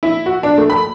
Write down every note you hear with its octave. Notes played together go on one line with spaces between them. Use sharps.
E4
F#4
D4
A3
B5